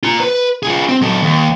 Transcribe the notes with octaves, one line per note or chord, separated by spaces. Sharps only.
F4 A#5
B4
F4 G#4
C4
F#3 A4
D#2